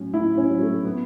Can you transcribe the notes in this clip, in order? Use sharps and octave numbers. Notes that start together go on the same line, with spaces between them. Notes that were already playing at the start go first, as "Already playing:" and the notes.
Already playing: A2 F#3 C#4
A2 E4
C#4
F#3
A3
B3